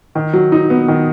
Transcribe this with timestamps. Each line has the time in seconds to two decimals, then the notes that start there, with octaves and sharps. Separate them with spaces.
0.15 D#3
0.33 F#3
0.52 D#4
0.70 B3
0.88 D#3